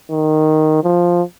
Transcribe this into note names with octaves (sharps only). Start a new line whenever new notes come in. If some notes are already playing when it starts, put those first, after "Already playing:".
D#3
F3